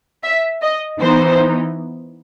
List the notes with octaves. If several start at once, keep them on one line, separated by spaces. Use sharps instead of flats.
E5
D#5
E3 B3 D#4 C5